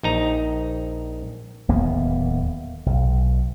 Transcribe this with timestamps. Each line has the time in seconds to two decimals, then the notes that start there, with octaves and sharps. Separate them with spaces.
0.03 A#1 D#4 A#5
1.68 D1 D#2 A#3 B3
2.86 B1